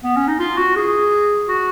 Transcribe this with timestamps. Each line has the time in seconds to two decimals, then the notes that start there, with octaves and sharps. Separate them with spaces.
0.03 B3
0.16 C#4
0.28 D#4
0.39 F4
0.57 F#4
0.75 G#4
1.48 F#4